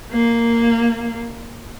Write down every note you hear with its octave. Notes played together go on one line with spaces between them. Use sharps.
A#3